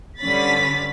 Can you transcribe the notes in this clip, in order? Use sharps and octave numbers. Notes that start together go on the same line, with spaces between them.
G2 D3 C#4 B5 A6 B6